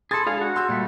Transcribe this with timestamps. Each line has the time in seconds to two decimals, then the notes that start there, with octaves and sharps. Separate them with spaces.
0.11 G#4 A4 B5 C6 A6
0.27 G#3 D4 G#4 F5
0.41 F#4
0.56 C6 E6 G6
0.69 A#2 G3 A3